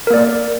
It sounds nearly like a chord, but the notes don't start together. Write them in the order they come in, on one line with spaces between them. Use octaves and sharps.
A#4 A#3 D5